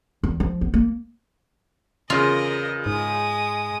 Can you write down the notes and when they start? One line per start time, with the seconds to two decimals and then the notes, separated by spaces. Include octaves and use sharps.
0.24 E2
0.40 F3
0.61 B3
0.74 A#3
2.10 E2 C#3 F4 A#4 D#5
2.86 G#2 G#3 D#6